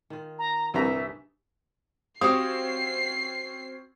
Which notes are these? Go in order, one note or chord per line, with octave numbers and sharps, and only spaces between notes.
D#3 F4
A#5
C2 G2 C3 G#4 B4 E5 A#5
C4 C#4 F#4 G4 F5 D#6 C7